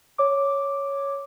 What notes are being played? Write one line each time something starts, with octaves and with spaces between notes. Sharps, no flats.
C#5 D6